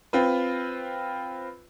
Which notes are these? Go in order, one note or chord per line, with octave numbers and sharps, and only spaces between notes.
C4 F4 B4